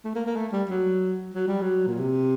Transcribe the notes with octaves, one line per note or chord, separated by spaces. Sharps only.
A3
A#3
A#3
A3
G3
F#3
F#3
G3
F#3
A#2
C3